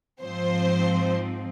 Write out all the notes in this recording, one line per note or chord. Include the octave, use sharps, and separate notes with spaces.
G#2 F3 C4 C5